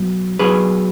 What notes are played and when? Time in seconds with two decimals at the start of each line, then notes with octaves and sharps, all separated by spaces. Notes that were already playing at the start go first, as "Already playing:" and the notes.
Already playing: B2 F#3
0.39 B2 F#3 G#4 B4